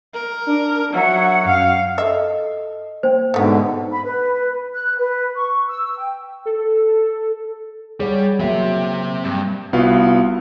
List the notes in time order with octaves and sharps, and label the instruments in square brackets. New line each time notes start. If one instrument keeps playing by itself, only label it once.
[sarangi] A#4
[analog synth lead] D4
[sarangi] F#3 [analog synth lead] E5 [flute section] F#5
[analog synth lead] F#2 [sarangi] F5
[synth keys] A4 D#5 [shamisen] E5
[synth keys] A#3 G5 [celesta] C5
[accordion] G#2 B2 D3 [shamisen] A3 B3
[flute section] B5
B4
F#6
B4
C#6
E6
G5
[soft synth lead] A4
[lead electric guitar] G3 [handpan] G#4 C#5 F#5
[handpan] F#3 A#3 [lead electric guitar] C4 E5
[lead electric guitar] G2
[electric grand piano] C2 B3 F4 F#4 F5